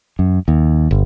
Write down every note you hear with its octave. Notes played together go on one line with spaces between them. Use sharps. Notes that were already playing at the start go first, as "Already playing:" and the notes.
F#2
D#2
G1